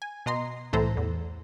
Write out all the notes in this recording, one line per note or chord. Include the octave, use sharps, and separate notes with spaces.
G#5
B2 D#5 A#5 C6
C2 A2 E3 A4 C5 A#5
E2